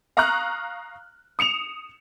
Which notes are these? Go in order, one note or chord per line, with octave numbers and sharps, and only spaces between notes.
F5 A#5 C#6 D#6 F6 F#6
D#6 C#7 E7 F7